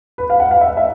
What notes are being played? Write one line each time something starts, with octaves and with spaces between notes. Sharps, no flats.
B4
F5
F#5
F5
E5
E5